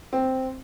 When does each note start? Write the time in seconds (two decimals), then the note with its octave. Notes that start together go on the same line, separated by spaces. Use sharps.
0.13 C4